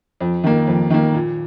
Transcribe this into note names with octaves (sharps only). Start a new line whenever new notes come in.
F2
D#3 A#3
F2
D#3 A#3
A#2